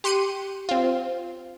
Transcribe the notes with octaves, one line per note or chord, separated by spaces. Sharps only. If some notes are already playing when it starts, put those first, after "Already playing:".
G4 C6 F#6 C#7 D#7
C4 F4